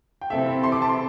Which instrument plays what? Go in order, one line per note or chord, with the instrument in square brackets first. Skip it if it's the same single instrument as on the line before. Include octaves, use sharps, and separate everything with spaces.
[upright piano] G5
[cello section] C3 E3 C4 E4 A4 [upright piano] E5
[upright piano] E5
C6
D6
A5
C6